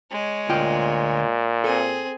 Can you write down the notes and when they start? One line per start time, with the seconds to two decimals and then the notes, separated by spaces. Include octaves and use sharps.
0.11 G#3 C#5
0.49 D2 A#2 F4 G5
1.64 C4 G#4 A4